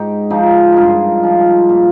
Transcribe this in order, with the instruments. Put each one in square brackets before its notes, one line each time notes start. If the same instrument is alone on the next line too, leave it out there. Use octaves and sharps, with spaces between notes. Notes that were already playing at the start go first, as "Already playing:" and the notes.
Already playing: [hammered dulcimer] G#2 D#4 G4
F3 D#4 G4
G2 F4 G#4 A#4
F3
A#2